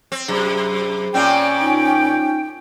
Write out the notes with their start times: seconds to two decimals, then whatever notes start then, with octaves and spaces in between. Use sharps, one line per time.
0.12 C4
0.28 F#2 C3 G#4 C5 B5
1.14 A#2 C4 C#4 D5 G5
1.61 D#4 F4